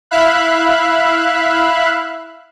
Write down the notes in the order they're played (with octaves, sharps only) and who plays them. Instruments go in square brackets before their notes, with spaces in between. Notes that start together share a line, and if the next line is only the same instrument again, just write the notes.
[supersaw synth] E4 E5 F5 B5 F#6